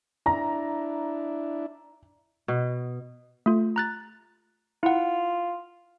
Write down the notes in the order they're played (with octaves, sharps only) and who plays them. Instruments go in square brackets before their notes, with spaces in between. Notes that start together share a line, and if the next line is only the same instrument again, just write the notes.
[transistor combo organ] D4 E4 [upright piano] A#5
[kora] B2
[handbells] A3 F4
A#5 F#6 A6
[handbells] E4 F#5 [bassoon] F4